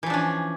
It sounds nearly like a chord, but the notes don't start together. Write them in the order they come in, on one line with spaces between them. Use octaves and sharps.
E3 F3 D4 C#4